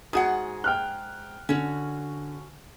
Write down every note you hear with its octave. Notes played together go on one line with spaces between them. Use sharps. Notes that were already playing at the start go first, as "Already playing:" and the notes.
G#2 F#4 G#4 F#5 D#6
G5 F6 F#6
D3 C#4 F#4